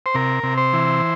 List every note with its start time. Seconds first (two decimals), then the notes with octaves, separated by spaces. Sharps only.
0.06 C5
0.14 C3 A#4
0.43 C3
0.58 C5
0.73 E3